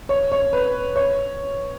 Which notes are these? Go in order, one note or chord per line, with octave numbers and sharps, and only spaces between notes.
C#5
C#5
B4
C#5